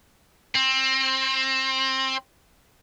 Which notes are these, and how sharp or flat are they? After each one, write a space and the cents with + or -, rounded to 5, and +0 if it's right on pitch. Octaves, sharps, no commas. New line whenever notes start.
C4 +20